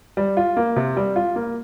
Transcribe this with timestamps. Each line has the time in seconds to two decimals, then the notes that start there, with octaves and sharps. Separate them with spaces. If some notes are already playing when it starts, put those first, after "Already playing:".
0.17 G3
0.37 F4
0.57 A#3
0.76 C3
0.97 G3
1.16 F4
1.36 A#3